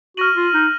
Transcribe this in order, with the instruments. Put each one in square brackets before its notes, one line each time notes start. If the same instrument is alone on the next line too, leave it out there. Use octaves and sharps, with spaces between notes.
[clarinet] F#4 [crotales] F6 A#6 D#7 F#7
[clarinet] F4
D#4